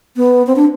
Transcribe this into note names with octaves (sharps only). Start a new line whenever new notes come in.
B3
C4
D4